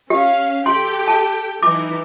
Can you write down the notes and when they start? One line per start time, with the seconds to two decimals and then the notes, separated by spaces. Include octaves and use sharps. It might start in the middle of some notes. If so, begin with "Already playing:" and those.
0.10 C#4 G4 F5
0.66 G4 A4 G5 C6
1.07 A5
1.63 E3 D#4 D6